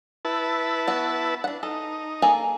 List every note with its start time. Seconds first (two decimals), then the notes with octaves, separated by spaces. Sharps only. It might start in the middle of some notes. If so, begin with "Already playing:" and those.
0.25 E4 B4 A5
0.87 B3 F#4
1.44 D4 F#5
1.63 D#4 A4
2.22 A#3 G#4 A4